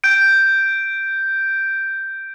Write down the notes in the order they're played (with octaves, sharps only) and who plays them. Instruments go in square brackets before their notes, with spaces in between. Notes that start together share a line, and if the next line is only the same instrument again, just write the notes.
[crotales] G6 D7